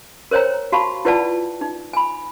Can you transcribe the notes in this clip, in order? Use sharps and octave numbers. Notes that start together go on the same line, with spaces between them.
A#4 C5 C#5 G5 A#5
F#4 F5 A5 B5 C#6
E4 F4 B4 D5 F#5 A5
D#4
G#5 B5